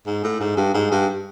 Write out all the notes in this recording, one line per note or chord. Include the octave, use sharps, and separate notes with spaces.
G#2
A2
G#2
G2
G#2
G2